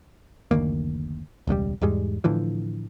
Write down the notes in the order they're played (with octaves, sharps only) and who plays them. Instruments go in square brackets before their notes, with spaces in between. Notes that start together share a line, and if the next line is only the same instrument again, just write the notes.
[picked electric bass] F#1 D2 D#3 A#3
E1 C#2 C#3 G3
E2 G#2 G3 G#3
A2 D3 E3 F3